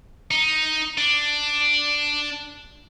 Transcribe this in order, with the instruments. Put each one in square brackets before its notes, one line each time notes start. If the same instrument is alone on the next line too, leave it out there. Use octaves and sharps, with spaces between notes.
[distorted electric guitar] D#4
D4